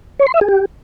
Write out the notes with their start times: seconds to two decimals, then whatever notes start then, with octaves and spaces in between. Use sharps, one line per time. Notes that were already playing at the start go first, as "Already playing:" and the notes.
0.19 C#5
0.27 C6
0.34 E5
0.41 G#4
0.48 G4